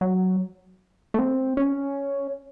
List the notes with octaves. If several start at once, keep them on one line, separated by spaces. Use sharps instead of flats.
F#3
A3
C4
C#4